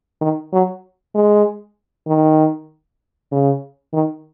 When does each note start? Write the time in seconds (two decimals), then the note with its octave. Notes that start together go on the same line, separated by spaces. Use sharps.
0.21 D#3
0.52 F#3
1.15 G#3
2.07 D#3
3.31 C#3
3.93 D#3